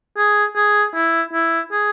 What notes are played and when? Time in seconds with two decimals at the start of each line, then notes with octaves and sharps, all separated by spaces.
0.18 G#4
0.56 G#4
0.95 E4
1.33 E4
1.72 G#4